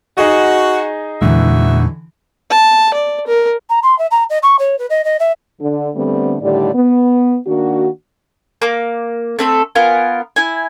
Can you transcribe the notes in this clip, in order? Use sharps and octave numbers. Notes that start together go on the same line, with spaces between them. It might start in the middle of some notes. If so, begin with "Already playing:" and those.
D#4 F#4 G#4 D#5
E2 A#2 D3 E3 G#3 D#4 F#4 E5
A5
D5
A#4
A#5
C6
E5
A#5
D#5
C#6
C#5
B4
D#5
D#5
E5
D3
D3 G3 A3 B3 C4
A2 D3 D#3 G3 G4 D5
B3
D#3 A#3 D4 F#4
A#3 D6
A3 C4 A4
B3 F4 A#4 G#5
E4 G#5